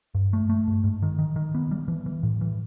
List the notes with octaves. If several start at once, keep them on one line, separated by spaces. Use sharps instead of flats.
G2
A3
A3
G2
G#2
D#3
D#3
D#3
B3
G3
E3
E3
A2
E3